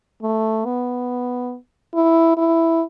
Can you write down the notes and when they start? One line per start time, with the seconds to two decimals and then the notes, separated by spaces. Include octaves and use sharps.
0.22 A3
0.65 B3
1.94 E4
2.37 E4